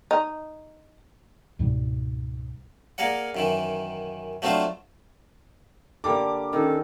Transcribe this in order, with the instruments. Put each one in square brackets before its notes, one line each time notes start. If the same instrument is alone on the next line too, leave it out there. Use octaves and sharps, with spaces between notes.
[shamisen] D#4
[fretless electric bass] C#2 G#2 B2 G3
[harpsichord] A#3 G#4 A#4 D5 F#5
F#2 D#3 E3
F#3 A3 C4 D4 F4 C5
[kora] D3 G3 A#3 [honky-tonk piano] D6
[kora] D#3 [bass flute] C#4 [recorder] A4